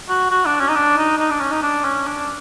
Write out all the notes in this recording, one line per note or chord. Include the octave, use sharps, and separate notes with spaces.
F#4
F#4
D4
C#4
D#4
D4
D#4
D#4
D4
C#4
D#4
D4
C#4
D4